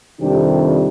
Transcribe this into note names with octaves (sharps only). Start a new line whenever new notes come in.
F2 C3 D#3 G3 D4 G4